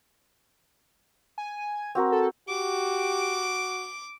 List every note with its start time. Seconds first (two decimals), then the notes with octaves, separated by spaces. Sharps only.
1.38 G#5
1.95 C4 F#4 A#4
2.12 A4
2.49 F#4 G4 D6